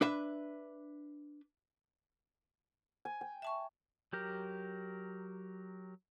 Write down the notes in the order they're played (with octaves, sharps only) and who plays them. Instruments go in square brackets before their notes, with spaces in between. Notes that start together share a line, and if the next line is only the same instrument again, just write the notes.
[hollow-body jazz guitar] D4 B4 E5
[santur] G#5
G5
[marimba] E5 A5 C#6
[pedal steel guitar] F#3 G4 A#4